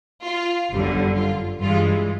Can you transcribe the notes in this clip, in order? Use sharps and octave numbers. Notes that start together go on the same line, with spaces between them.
F4
G1 F#2 D3 G3
F4
G2 E3 G#3 F4